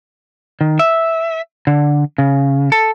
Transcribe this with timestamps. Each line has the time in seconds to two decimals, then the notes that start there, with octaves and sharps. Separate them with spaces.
0.61 D#3
0.79 E5
1.67 D3
2.18 C#3
2.72 A4